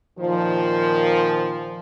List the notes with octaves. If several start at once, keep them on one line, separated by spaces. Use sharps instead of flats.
A#2 D#3 F3